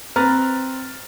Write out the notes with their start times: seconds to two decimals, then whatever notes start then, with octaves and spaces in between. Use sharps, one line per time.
0.16 C4 B4 A#5 F6 A6